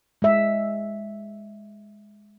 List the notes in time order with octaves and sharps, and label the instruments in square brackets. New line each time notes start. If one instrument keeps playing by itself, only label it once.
[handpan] G#3 E5